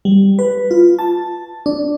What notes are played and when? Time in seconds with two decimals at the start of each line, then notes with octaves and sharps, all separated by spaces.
0.05 G3
0.39 B4
0.71 F4
0.99 A5
1.66 D4